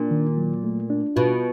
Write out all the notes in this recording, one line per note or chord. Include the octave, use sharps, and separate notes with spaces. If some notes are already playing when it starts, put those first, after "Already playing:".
Already playing: A#2 D4
D#3
F#3
A3
D4
B2 F4